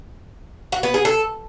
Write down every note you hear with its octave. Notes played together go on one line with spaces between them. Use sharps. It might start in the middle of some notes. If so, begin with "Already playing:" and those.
F#4
B3
G#4
A4